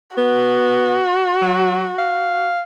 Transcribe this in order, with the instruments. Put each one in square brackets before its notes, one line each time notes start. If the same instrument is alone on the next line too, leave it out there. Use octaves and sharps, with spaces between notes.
[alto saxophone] B3 [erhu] F#4
[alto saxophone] F#3
F5